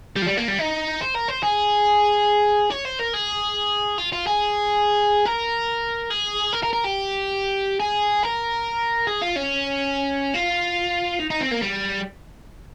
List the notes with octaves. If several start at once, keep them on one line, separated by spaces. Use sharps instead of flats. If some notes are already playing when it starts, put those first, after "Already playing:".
G3
F3
G3
A#3
G3
D#4
C5
A#4
C5
G#4
C#5
C5
A#4
G#4
F4
F4
G#4
A#4
G#4
A#4
A#4
A#4
G4
G#4
A#4
G#4
F4
C#4
F4
D#4
D#4
C4
A#3
G3